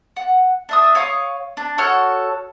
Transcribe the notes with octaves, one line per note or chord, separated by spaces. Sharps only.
F#5
D4 E5 D#6
C#5 F5 C#6 D#6
D4
F#4 A4 C#5 F6